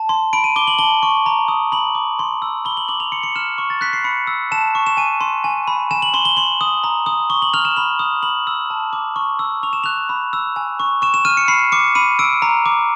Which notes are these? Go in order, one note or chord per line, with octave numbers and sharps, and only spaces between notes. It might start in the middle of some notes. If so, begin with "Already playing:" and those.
Already playing: A5
C6
B5 D7
D#7
D6 G7
F#7
A5 G7
C#6
A#5
D#6
B5 F#7
D6
C6
E6
B5 G7
F#7
D6 F#7
F7
C6 C#7
C#7
F6 E7
C#6
A6
F#6 B6
C7
B5 C#7
E6
A5 E7
C#6
E7
G#5 D#7
C6
G#5
B5
G#5 E7
F#7
C6 G7
G7
C6 F#7
D#6
A#5
D#6
C#6 G7
F#7
F6 F7
E7
B5 F7
D#6
B5 F#7
E6
A5
D6
C#6
E6
C#6 F7
E7
F#6 F7
B5
E6
G#5
C#6
C#6 E7
E7
F6 D#7
C#7
B5 C7
D6 C#7
B5 D#7
E6 D7
A#5
D6